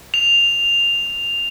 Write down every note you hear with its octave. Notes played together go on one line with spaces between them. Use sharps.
F7